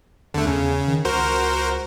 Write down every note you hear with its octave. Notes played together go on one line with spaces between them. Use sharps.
E2 D3 A3
E2 C#3
D#3
C#2 F#4 A#4 C5